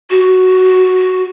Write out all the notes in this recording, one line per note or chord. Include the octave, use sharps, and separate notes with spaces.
F#4